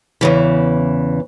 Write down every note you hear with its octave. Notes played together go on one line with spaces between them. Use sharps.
E2 C#3 E3